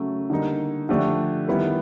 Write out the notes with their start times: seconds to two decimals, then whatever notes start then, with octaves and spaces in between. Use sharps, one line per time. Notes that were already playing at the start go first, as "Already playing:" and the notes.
Already playing: C#3 F#3 A3
0.30 D3 G3 A#3 D#4
0.89 D3 F3 A3 D4 G4
1.47 D#3 G3 B3 E4